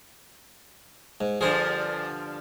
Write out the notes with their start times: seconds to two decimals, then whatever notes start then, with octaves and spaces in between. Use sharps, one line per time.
1.21 G#2
1.41 G2 D3 F3 G#4 C5 A#5